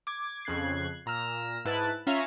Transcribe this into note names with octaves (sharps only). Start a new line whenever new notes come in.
D6 G#6
F2 C#3 F#6 G#6 C7
A#2 A#5 E6 F6
G#2 E4 B4 A5 F#6 A6
C#4 F4 C#5 E5 F5 A#5